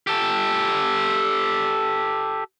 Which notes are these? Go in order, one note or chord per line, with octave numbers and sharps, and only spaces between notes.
G4 A4